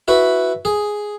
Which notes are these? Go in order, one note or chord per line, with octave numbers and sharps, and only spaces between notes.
E4 F#4 B4
G#4